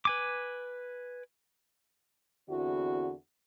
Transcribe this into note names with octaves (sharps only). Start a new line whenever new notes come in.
B4 G#5 D6
E2 D3 C4 E4 F#4